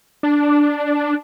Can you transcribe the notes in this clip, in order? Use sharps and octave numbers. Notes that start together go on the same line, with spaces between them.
D4